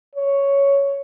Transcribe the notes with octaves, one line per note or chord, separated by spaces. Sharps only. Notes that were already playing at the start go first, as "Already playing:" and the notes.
C#5